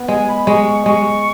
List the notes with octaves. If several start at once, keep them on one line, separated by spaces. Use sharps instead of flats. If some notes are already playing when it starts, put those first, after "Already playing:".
Already playing: B3
G#3 G#5
B5
G#3 C#6
G#3 C#6